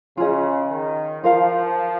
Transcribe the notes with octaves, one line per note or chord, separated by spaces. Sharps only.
C#3 F4 G#4 D#5
D#3
F3 F4 A#4 F5